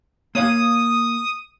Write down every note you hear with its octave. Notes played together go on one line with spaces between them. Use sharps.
A#3 C#5 F5 D#6